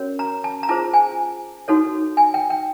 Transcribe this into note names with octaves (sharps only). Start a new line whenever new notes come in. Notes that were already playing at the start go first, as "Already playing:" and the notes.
Already playing: C#4 F#4 A#4 C#5
A#5
A5
A#5
F4 G#4 C5 A5
G#5
D#4 F#4 A4 C#5
G#5
G5
G5